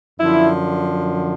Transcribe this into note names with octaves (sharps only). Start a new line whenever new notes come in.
F#2 D3 F3 E4